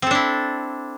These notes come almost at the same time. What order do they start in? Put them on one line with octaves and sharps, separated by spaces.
C4 A4 D4 E4